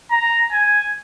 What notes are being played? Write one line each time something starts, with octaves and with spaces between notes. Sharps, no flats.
A#5
G#5